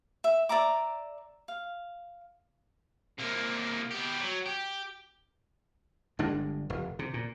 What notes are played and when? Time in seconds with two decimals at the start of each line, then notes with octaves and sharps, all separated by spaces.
0.24 E5
0.49 D5 E5 A#5 D6
1.48 F5
3.19 C3 A#3
3.91 B3 G4
4.20 F#3
4.46 G4
6.19 G1 G2 G#3 D4
6.70 F1
6.99 C3
7.14 A#2